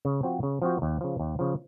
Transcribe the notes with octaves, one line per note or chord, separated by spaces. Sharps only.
C#3
F3 C4 F#4
C#3
F3 C4 F#4
D#2
C#3 F3
D#2
C#3 F3